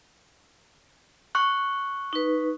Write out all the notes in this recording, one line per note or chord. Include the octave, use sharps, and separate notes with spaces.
C#6 F#6
D#4 B4